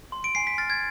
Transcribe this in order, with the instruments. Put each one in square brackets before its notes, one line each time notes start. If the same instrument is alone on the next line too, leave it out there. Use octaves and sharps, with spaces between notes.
[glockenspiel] C6
D7
G#5 C7
B6
F6 A6
G#6